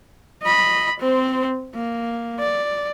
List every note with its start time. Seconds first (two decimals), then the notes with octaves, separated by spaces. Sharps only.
0.43 D#5 B5
1.00 C4 C5
1.75 A#3
2.40 D5